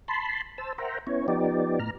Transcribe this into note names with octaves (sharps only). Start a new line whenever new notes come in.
A5 B5 C6
C5 A5 E6
A#4 C5 E5 F#5 G5 A#5
B3 C#4 E4 C#5
F3 B3 D#4 G4 D5
A2 A#5 F6